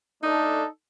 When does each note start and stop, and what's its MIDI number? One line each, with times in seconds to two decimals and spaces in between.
0.23 0.65 57
0.23 0.65 62
0.23 0.66 63
0.23 0.65 69